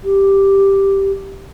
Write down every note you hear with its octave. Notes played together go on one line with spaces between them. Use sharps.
G4